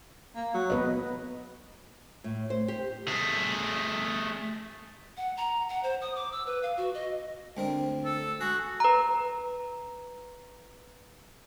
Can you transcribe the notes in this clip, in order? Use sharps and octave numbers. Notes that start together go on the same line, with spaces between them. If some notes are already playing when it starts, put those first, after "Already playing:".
A#3
F#3
B3 B4 D#5
A2
C5
G4
A3 G#4
F#5
A#5
F#5
C5
D#6
D6
E6
B4
F5
F#4
D#5
D2 C4 A#4
A4
F#4 G#4
B4 A#5